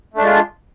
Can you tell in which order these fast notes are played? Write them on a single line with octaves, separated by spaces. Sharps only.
A3 D4 G#3 F4